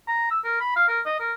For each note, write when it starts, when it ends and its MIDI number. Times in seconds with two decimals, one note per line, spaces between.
0.08 0.29 82
0.31 0.39 88
0.44 0.59 70
0.61 0.73 83
0.76 0.86 77
0.88 1.00 70
1.06 1.18 75
1.20 1.32 70